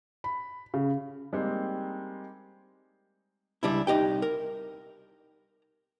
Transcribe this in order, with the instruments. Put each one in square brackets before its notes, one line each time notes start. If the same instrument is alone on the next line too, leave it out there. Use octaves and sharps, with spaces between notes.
[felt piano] B5
C#3
[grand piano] G3 G#3 A#3 C4 D#4
[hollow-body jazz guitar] C#2 G3 D4 E4
C2 D#4 G4 G5
A#4